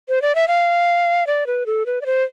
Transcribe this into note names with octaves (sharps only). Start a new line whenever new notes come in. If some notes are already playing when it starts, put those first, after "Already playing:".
C5
D5
E5
F5
D5
B4
A4
B4
D5
C5